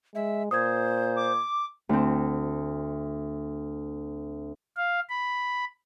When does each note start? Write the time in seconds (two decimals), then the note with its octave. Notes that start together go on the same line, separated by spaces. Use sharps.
0.15 G#3 E5
0.51 A#2 C5 D#6 G#6
1.16 D6
1.89 D2 C4
4.76 F5
5.09 B5